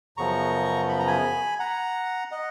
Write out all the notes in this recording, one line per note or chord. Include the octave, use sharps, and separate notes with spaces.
F#2 C#3 F3 B3 A#5 C#6
B5
A#5
G#5 B5
F#5 A#5
D#5 F#5